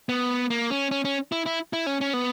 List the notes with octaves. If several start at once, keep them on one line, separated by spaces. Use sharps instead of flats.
B3
A#3
C#4
C#4
C#4
E4
E4
E4
C#4
C#4
B3